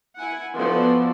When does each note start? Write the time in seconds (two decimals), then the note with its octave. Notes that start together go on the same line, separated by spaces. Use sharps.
0.19 E4 F#5 G#5
0.56 F3 B3 E4 F#4 A4 D5